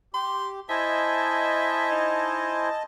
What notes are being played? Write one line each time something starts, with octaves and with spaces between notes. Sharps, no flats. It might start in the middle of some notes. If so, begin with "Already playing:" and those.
G4 C6
E4 C5 D#5 E5 G#5 A5
D#4